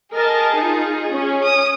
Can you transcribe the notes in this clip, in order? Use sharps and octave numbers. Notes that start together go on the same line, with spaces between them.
G#4 A#4 D#5 A5
D#4 F4
C#4
D#6